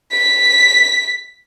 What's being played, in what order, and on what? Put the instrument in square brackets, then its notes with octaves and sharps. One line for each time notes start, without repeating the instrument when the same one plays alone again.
[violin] B6